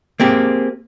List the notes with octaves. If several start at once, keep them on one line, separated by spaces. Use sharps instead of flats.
A#3 C4 G4 G#4